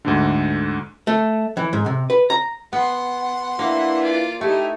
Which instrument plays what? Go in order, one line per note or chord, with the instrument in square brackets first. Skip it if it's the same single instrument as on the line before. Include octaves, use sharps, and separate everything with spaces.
[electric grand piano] D2 G#2 D3
[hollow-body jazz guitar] A3
E3
G#2
C3
B4
A#5
[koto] B3 [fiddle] F#5 C6
[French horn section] E3 D4 E4 [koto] A#3
[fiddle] F4 D5
[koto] A3 [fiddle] D#4 E4 [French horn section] G4